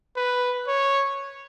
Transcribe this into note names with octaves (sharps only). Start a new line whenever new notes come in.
B4
C#5